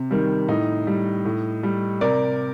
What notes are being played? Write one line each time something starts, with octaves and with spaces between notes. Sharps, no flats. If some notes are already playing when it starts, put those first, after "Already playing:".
Already playing: C3
D#3 G3
A2 D#4
G3
A2
G3
C3 A#4 D5